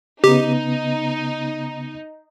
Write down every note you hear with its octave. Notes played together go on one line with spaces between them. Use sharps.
C#3 B3 D#4 G4